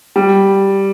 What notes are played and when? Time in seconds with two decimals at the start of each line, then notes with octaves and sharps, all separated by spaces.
0.16 G3